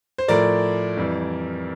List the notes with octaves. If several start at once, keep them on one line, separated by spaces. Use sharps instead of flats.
C5
A2 F3 A3 A#4 D5
F2 E3 G3